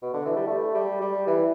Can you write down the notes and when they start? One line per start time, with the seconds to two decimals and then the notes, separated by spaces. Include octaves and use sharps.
0.03 B2
0.14 D3
0.26 E3
0.37 G3
0.47 A3
0.74 G3
1.01 G3
1.28 E3